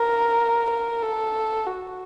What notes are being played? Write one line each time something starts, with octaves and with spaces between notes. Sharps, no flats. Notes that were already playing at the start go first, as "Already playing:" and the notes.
Already playing: A#4
A#4
A4
F#4